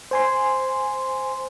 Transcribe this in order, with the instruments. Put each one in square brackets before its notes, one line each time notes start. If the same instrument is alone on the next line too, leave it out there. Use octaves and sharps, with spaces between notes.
[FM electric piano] C5 G#5 C6